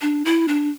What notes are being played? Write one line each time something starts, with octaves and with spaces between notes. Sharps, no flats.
D4
E4
D4